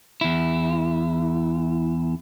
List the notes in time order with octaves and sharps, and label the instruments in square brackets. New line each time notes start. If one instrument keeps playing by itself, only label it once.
[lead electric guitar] E2 E4